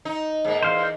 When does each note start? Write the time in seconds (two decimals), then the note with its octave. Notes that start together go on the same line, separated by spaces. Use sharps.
0.05 D#4
0.45 G#2 A#3
0.63 E2 C5 F5